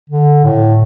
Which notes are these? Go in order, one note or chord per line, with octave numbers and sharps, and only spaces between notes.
D3
A2